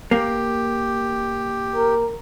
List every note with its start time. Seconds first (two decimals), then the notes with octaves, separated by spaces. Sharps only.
0.11 A#3 G4
1.76 A#4